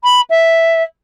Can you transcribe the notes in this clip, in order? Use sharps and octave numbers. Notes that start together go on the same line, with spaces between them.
B5
E5